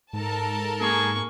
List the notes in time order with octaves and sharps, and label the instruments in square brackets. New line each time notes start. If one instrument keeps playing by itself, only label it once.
[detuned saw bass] G#2 [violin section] A4 A#4 A5
[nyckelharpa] A#3 C#6 [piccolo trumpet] G#4